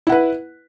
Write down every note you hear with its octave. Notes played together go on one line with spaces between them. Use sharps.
E4 B4 F#5